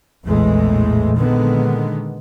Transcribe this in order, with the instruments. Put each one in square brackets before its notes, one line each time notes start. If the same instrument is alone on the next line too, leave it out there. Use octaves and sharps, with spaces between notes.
[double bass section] A#1 E2 A2 E3 G#3 A3
A#2 D3 D#3 G#3 B3